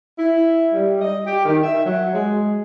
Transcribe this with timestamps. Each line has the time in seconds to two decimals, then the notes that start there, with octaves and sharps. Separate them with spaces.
0.18 E4
0.74 G3
1.02 D#5
1.27 G4
1.46 D#3
1.63 E5
1.85 F#3
2.14 G#3